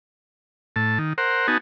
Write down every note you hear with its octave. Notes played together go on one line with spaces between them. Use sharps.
A2 A5
D#3
A#4 C5 F#5
B3 D#4 F#4 G#5 A5